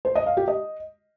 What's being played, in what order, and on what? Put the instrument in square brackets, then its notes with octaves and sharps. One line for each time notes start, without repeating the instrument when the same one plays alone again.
[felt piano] C5
D#5
F5
G4
D#5